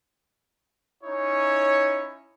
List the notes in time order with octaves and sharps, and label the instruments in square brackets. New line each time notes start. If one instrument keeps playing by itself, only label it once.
[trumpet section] C#4 D#4 E4 C#5